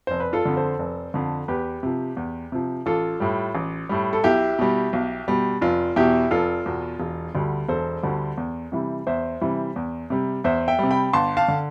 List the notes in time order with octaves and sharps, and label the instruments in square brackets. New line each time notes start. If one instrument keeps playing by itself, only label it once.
[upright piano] F1 C5
B4
F4 A4
F2 D3
A4 C5
F1
F2 D3
E2 G4 B4
C3 F3
E2
C3 F3
A1 F4 A4
A2 G3
A1
A2 G3
A4
B1 E4 G4
B2 G3
B1
B2 G3
F1 F4
E2 B2 E4 G4
F1 F4 A4
E2 B2
E1
D2 D3 G3
E1 A4 C5
D2 D3 G3
E2
C3 E3 G3
E2 C5 E5
C3 E3 G3
E2
C3 G3
E2 C5 E5
E5 G5
C3 G3
G5 B5
G1 A5 C6
F5 A5
D3